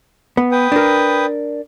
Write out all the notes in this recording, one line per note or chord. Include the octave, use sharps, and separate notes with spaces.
B3
B4 G5 D#6
D4 A#4